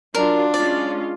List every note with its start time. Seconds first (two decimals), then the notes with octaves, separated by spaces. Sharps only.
0.15 F#3 D4 F4 A#4
0.54 G#3 C#4 F4 D5